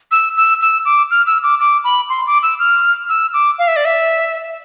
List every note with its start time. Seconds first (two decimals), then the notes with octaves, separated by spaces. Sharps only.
0.11 E6
0.37 E6
0.61 E6
0.85 D6
1.11 F6
1.27 E6
1.43 D6
1.60 D6
1.84 B5
2.09 C6
2.27 D6
2.43 E6
2.59 F6
3.09 E6
3.34 D6
3.59 F5
3.68 E5
3.76 D5
3.85 E5